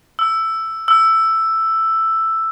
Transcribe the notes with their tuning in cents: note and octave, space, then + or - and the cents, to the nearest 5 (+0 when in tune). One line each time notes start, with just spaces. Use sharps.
E6 +5
E6 +5